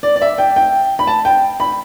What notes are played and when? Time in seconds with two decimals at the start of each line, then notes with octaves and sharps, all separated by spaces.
0.03 D5
0.16 D5
0.22 E5
0.38 G5
0.56 G5
0.99 B5
1.07 A5
1.25 G5
1.60 B5